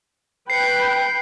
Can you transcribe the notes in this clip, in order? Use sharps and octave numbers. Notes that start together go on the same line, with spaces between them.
B4 G5 B5 C7 C#7